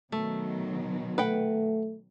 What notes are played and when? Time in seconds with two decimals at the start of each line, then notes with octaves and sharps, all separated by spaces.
0.12 B2 D#3 F#3 A3
1.18 A3 B4 F#5 G5